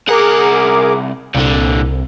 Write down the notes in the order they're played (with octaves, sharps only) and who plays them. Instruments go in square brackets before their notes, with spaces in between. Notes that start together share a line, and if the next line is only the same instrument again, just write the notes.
[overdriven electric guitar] C2 F#5 [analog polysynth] G#4 A#4 D6
[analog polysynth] C2 [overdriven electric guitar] A#2 D3